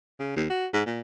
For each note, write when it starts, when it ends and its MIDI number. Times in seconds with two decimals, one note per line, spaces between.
0.20 0.32 49
0.36 0.47 39
0.50 0.67 66
0.73 0.81 44
0.86 1.00 46